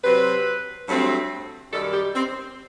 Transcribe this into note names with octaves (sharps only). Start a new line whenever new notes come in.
C3 F#3 C4 B4
G2 F#3 A3 C4
F#2 D#3 G3 A4
G4
C4